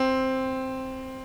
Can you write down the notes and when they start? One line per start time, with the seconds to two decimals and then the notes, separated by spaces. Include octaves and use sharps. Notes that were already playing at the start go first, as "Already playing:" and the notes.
Already playing: C4